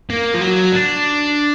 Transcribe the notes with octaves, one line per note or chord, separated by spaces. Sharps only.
A#3
F3
F#3
D4